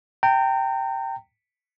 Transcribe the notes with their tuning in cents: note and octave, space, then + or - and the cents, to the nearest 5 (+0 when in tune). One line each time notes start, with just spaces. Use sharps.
G5 -5 A#5 -35